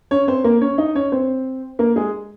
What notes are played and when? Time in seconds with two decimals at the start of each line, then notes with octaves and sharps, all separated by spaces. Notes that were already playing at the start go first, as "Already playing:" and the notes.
0.11 C#4 C#5
0.27 C4 C5
0.44 A#3 A#4
0.61 C#4 C#5
0.78 D#4 D#5
0.95 C#4 C#5
1.12 C4 C5
1.79 A#3 A#4
1.96 G#3 G#4